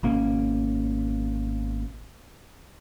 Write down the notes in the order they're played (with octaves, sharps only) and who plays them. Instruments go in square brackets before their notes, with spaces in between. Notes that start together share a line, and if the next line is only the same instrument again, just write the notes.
[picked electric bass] G#1 B2 A#3 C#4